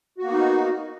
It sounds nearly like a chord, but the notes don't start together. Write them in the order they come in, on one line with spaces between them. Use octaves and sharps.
F#4 A#3 B3 D#4